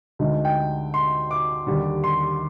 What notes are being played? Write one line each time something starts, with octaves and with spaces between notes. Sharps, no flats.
D2 D3 G#3 D#4
G5
C6
D6
D#2 D3 G3
C6